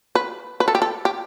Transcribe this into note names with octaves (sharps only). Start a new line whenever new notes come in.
B4
B4
A4
G4
A4
G4